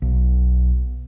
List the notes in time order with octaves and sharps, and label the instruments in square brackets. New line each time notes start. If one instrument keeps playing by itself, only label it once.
[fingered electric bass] B1